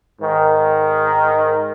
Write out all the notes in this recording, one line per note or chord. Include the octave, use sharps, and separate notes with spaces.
G#2 D#3